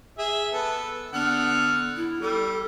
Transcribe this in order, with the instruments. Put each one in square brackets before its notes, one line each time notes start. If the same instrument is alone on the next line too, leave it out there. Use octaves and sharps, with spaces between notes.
[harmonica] G#4 E5
B3 A4
[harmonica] D3 F#5 F6 [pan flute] B3
[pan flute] E4
[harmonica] G3 [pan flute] A4